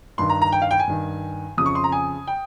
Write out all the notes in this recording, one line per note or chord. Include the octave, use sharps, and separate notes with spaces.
G2 D#3 C6
A#5
A#5
G5
F5
G5
G#5
G2 D#3
F2 C#3 D#6
C#6
C6
A#5
G#5
G5